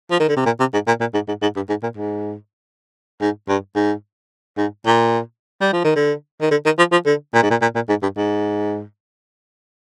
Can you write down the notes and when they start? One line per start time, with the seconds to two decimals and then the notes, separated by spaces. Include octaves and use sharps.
0.11 F3
0.20 D#3
0.29 D3
0.36 C3
0.45 A#2
0.60 C3
0.73 G#2
0.87 A#2
1.00 A#2
1.14 G#2
1.28 G#2
1.42 G#2
1.56 G2
1.69 G#2
1.83 A#2
1.97 G#2
3.21 G#2
3.48 G2
3.75 G#2
4.58 G#2
4.86 A#2
5.61 G3
5.73 F3
5.84 D#3
5.95 D3
6.41 D#3
6.51 D3
6.65 D#3
6.78 F3
6.92 F3
7.06 D3
7.34 A#2
7.42 G#2
7.50 A#2
7.61 A#2
7.75 A#2
7.89 G#2
8.02 G2
8.17 G#2